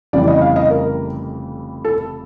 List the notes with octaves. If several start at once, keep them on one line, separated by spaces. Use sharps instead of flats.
F1 F2 C#3 E3 G3 D5
D#5
F5
D#5
A#4
A4